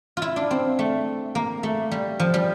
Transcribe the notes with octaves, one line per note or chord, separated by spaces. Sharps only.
E4 F4
D4
C4
A3
A#3
A3
G3
F3
G3